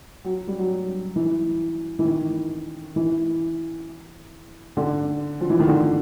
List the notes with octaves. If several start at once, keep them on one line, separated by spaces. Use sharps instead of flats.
F#3
G3
F#3
E3
E3
D#3
E3
D3
F3
E3
D#3
D3